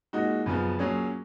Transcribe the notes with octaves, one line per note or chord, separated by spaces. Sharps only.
A#2 G#3 D#4 F#4
F#2 C#3 F3 B3
A#2 F#3 C#4 G#4